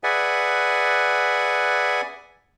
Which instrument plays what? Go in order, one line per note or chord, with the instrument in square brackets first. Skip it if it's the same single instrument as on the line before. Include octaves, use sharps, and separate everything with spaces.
[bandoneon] G#4 B4 D5 E5 F#5 G#5